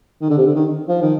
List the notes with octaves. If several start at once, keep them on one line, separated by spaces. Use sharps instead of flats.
D#3
D3
C3
D3
D#3
F3
D#3